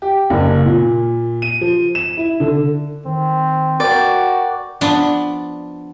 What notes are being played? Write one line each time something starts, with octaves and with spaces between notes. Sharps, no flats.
G4
F#1
A#2
D#7
F3
E7
E4
D3
D#3 C4
F#4 A#4 D5 G5
F3 B3 D4